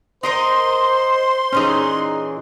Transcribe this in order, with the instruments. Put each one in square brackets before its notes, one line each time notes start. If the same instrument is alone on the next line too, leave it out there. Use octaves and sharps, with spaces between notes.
[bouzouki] D#4 A#4 D#5 [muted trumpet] C5 [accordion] C6
[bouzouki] A#2 E3 G#4 [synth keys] C#4 D#4